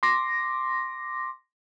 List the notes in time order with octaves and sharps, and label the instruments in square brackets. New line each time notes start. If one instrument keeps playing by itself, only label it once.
[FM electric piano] C6 D6 A#6